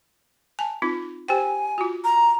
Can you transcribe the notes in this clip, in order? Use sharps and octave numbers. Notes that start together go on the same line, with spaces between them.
G#5 A5
C4 D#4 F4
G4 C5 G5 G#5
F4 F#4
A#5